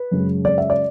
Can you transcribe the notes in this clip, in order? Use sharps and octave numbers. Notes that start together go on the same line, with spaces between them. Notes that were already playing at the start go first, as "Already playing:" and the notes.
Already playing: B4
F#2 C#3 G#3
D5
E5
D5